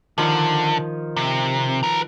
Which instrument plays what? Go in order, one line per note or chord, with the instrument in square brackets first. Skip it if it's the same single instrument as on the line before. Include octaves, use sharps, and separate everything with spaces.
[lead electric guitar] D3 [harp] D#3 F3
[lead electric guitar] C3
B4 A#5